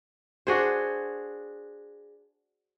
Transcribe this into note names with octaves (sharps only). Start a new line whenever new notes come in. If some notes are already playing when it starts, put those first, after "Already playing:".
D4 F#4 G#4 C5